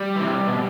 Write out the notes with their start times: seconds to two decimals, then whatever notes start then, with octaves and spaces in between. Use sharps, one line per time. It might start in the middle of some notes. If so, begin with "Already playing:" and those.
Already playing: G3
0.16 E3
0.21 C3
0.48 B2